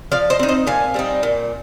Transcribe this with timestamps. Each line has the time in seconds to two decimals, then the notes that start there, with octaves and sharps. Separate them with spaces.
0.12 F3 D5 F5
0.30 C5 D#5
0.39 C4 D#4
0.49 C5 D#5
0.67 A#2 F5 G#5
0.94 G3 C4 D#4
1.23 A#2